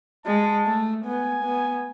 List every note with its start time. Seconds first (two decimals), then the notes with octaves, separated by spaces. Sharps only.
0.26 G#3 A5
0.66 A3
1.05 B3 G#5
1.44 B3